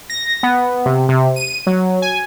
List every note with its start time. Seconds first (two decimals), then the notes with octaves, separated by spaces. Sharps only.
0.10 A#6
0.43 B3
0.86 C3
1.09 C3
1.36 D#7
1.67 F#3
2.02 G#5